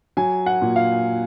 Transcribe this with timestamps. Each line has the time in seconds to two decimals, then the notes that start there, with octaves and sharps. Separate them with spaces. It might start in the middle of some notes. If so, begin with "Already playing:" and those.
0.17 F#3 G#5
0.46 F#5
0.61 A#2
0.76 F5